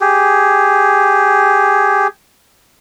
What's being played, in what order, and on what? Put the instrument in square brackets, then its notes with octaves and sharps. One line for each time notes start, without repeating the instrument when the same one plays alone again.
[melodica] G4 G#4